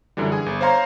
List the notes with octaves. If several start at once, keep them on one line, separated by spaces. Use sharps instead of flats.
F#2 D3 E3 G3
G#4 G#5
G1
C5 C#5 F5 A#5 C6